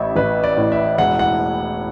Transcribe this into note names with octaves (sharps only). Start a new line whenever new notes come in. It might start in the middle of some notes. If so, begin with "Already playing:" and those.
Already playing: A1 E4 E5
A1 B4
D5
A2
E5
E1 F#5
F#5